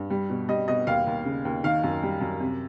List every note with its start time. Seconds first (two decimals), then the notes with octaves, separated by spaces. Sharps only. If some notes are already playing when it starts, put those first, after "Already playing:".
Already playing: G2
0.10 G3
0.30 B2
0.48 G3 D#5
0.68 B2 D#5
0.87 D#2 F5
1.07 D#2
1.25 C#3
1.45 D#2
1.64 D#3 F5
1.84 F#2
2.03 G3
2.21 F#2
2.40 C3